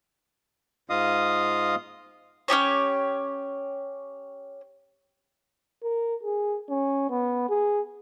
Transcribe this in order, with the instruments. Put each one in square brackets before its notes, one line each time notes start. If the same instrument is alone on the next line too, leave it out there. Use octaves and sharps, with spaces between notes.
[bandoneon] G#2 F4 D#5 F5 D#6
[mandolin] C#4 D#4 G4 C#5
[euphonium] A#4
G#4
C#4
B3
G#4